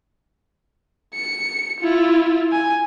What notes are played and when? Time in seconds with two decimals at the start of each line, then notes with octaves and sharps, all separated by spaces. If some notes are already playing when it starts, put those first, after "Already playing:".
1.14 C#7
1.80 E4 F4
2.52 G#5